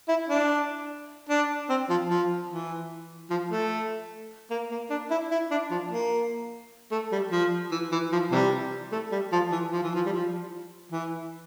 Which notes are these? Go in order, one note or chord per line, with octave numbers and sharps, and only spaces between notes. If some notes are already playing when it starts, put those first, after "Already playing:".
E4
D4
D4
C4
F3
F3
E3
F3
A3
A#3
A#3
D4
E4
E4
D4
F3
A#3
A3
G3
F3
E3
E3
F3
C3 E3 G3
A3
G3
F3
E3
F3
E3
F3
G3
F3
E3